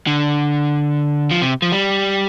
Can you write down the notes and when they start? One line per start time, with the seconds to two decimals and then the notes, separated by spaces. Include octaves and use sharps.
0.07 D3
1.31 F3
1.42 C3
1.62 F3
1.72 G3